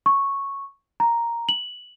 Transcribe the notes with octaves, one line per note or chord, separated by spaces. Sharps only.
C#6
A#5
F#7